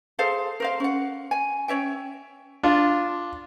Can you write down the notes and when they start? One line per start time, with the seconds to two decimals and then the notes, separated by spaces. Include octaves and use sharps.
0.19 G#4 A4 C5 F5
0.60 A#4 C5 F5
0.80 C#4 F#5
1.31 G#5
1.68 C#4 C#5 E5 G5
2.63 D4 F4